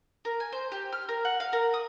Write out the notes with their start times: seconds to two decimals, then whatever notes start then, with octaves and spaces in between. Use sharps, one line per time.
0.25 A#4
0.40 G#5
0.52 C5
0.72 G4
0.93 F6
1.09 A#4
1.25 F#5
1.40 F5
1.53 A#4
1.74 D#6